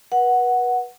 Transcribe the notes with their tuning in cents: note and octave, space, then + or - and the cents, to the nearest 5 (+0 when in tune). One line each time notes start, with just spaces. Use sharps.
B4 -35 F#5 +0